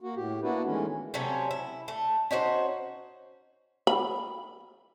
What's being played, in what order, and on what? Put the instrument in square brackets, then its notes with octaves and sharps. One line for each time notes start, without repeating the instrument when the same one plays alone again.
[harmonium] A#3 F#4
A2 G4
A#3 B3 D4 E4 F#4 B4
D#3 E3 G#3 A3 C#4
[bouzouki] C3 F#3 A3 C#4
E4
A3
C#4 D#4 F#4 C5
[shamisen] B5